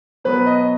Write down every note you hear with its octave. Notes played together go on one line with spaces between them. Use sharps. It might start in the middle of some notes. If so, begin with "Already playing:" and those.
B2 F#3 B3 B4
D#5